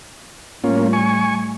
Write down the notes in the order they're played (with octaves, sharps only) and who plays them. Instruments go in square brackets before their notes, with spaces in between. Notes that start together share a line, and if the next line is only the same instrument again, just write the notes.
[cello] A2 G3 [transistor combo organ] A#3 C#4 F4
[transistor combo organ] G#5 C#6